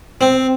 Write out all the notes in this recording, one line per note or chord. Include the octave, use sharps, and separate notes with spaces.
C4